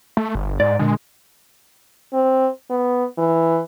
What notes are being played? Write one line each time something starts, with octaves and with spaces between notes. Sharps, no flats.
A3
G1
G#2 D5
A#2 D3 G#3
C4
B3
E3